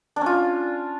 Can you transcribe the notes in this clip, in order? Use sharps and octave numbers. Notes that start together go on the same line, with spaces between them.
C#4 D4 F4